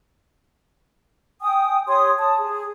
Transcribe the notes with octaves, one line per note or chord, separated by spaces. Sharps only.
G5 G#5 D#6
G4 C#5 C6 D#6
A5 D#6
G#4